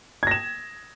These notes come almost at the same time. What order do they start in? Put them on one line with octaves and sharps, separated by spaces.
G#6 A#6 E7